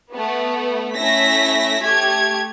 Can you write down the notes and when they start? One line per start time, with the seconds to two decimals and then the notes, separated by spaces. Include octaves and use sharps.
0.13 A3 B3
0.98 A3 C#4 E4 E5 A#6 B6
1.83 A3 G4 G#6